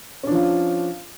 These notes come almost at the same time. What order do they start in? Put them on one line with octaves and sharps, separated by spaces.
C#4 D4 F3 F4